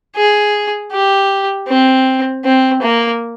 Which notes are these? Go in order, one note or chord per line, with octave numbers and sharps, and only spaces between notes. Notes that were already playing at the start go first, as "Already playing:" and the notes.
G#4
G4
C4
C4
A#3